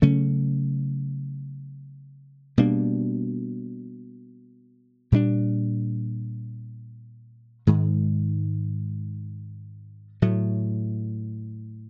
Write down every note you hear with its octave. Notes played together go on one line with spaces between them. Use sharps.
C#3 F#3 A3 C#4
B2 G3 A#3 D4
A#2 G3 B3 D4
G#2 D#3 G#3
A2 F#3 A3